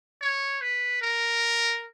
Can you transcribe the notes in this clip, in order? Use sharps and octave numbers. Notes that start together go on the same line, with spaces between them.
C#5
B4
A#4